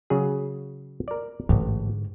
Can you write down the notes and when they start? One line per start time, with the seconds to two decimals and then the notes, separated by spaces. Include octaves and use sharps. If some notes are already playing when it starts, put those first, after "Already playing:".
0.10 C#3 F#3 G#4
1.08 A#4 D5
1.49 A1 G#2 D3